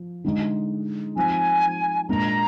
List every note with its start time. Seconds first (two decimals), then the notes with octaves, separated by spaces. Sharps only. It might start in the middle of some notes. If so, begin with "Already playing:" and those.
Already playing: F3
0.24 D3 G#3 D#4
1.16 F3 C4 D#4 G#5
2.08 A#2 G#3 D4 A#5